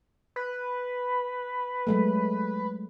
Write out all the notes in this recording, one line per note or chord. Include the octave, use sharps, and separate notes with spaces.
B4
F#3 G#3 A3